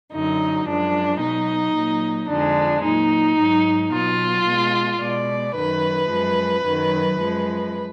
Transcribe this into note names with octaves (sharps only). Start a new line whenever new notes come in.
F#2 D3 F#3 D#4
F#2 F3 G#3 D4
B2 F#3 D#4
A#2 F#3
F2 D3 F3 G#3 D4
A#2 F#3 D#4
G#2 F#3
B2 F#3 F4
B2 G#3
B2 G#3 D5
F#2 D#3 F#3 B4
F#2 F3 G#3
F#2 D#3 F#3
F#2 F3 G#3